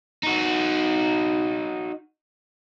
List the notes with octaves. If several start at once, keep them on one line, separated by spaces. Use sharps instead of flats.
D#4 F#4